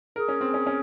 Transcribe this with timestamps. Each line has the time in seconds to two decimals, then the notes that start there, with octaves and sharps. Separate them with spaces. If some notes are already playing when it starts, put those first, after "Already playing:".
0.16 G#4 A#4
0.28 C#4
0.41 C4
0.54 C#4
0.67 C#4